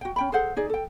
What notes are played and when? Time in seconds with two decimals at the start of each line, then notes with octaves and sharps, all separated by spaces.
0.01 F#4 G5
0.16 C#4 G5 B5
0.32 G#4 A4 C5 F#5
0.56 D#4 G#4 D5
0.70 A4 G5